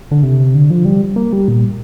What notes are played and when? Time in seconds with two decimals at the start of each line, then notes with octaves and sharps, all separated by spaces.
0.11 D3
0.23 C3
0.55 D3
0.70 F3
0.85 G3
1.16 A#3
1.33 G3
1.48 A#2